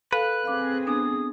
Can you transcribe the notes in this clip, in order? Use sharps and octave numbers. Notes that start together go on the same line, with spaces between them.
A4 B4 F5 G#5 F#6
C4 G#4 F5 D6
B3 D4 G#5 D#6